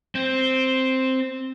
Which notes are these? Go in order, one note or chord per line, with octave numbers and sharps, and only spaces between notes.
C4